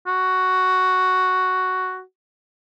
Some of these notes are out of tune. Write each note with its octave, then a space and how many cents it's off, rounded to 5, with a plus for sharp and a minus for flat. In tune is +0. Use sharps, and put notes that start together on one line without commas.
F#4 +5